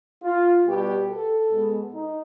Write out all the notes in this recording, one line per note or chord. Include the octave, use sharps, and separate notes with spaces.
F4
B2 G3 B3 G4
A4
B2 G#3 B3
D#4